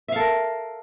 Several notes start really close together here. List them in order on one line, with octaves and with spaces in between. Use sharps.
E5 F5 A4 A#4